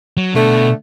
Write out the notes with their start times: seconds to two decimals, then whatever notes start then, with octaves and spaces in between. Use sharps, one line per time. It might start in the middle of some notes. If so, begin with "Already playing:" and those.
0.17 F#3
0.34 B2 D3 A3